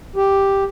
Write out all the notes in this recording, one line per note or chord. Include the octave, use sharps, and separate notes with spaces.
G4